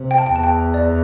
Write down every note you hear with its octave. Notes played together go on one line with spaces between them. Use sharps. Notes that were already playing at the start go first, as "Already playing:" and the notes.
Already playing: C3
G5
A5
G5
E2 A5
G5
D5